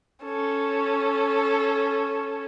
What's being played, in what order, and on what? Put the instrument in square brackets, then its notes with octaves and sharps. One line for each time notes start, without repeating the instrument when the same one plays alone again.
[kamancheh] C#4 A4